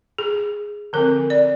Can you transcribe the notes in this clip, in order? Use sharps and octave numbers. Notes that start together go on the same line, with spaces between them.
G#4
D3 F3 C4 A#4
D5